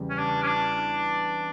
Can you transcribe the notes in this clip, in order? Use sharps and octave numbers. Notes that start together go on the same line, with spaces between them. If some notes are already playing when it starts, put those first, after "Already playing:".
Already playing: E2 C#3 G3
C#4
D4
C#4
D4